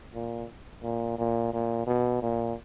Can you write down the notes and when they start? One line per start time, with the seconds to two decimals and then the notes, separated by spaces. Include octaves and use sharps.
0.14 A#2
0.83 A#2
1.18 A#2
1.53 A#2
1.87 B2
2.22 A#2